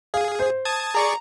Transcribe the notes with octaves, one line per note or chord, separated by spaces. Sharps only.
G#4 F5
C5
A5 D#6 G#6
G#4 D5 A#5 C#6